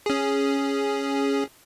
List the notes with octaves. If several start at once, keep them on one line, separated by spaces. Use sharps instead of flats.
C#4 G#4